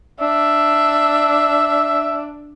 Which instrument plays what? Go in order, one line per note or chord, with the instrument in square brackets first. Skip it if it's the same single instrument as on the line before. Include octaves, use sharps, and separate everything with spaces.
[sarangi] D4 [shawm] E5